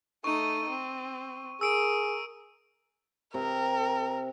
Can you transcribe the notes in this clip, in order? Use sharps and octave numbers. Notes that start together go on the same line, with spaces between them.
A3 D#4 C#6 D#7
C4
G#4 A#4 E6 D7 D#7
C3 A#4